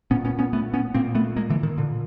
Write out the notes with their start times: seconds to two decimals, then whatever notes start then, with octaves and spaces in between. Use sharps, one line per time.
0.11 A#2 B3 C#4
0.25 B3 C#4
0.39 B3 C#4
0.53 A3 B3
0.74 B3 C#4
0.94 A#2 A#3 C4
1.15 A3 B3
1.36 G#3 A#3
1.50 D3 E3
1.63 D#3
1.77 A#2 D3